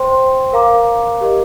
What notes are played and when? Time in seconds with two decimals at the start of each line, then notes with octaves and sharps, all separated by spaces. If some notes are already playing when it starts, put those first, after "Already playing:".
Already playing: C5 G5 C6
0.52 A#4 F5 A#5 D6
1.21 G4 A#4 D#5